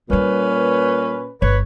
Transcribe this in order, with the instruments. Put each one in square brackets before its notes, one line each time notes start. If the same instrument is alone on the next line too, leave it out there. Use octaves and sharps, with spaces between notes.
[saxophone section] A#2 C#4 B4 [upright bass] G3 A#3
[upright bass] G1 [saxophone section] B4 C#5